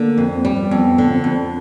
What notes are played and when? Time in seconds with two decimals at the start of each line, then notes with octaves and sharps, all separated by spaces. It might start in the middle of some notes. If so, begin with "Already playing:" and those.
Already playing: D3 A#3
0.18 F2
0.27 B3
0.32 C4
0.45 G3
0.65 C4
0.71 F2 B3
0.98 D3
1.11 C4
1.21 F2 B3
1.31 C4